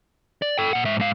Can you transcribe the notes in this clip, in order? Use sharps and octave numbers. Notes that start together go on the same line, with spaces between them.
D5
A4 G5
A#2 F#5
G#2 E5
G#2 F5